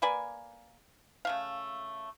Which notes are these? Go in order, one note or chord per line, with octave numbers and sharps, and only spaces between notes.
A#3 B4 D5 G#5
C#3 A3 F5